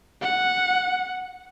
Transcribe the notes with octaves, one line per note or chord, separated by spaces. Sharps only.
F#5